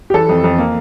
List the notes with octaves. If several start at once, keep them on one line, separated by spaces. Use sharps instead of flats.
G4
E3 A4
F2
F2
A#3